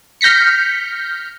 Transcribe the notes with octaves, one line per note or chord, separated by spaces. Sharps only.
F6 G6 A#6 B6 C#7